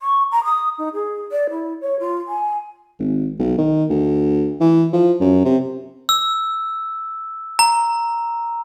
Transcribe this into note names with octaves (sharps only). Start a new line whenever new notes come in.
C#6
A#5
D#6
D#4
G#4
D5
E4
C#5
F4
G#5
G#1
B1
D#3
D2
E3
F3
F#2
C3
E6
A#5